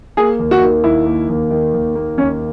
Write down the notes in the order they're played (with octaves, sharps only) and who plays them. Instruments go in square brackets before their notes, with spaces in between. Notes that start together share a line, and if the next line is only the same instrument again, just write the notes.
[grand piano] A#3 [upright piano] G#4
[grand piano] D#2
[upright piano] F#4
[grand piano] D#3
[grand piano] D#2 [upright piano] E4
[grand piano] A#3
D#2
D#3
D#2
A#3
[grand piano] D#2 [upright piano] C#4